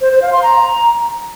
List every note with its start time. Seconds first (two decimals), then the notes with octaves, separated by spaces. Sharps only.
0.01 C5
0.12 C5
0.22 F5
0.32 C6
0.43 A#5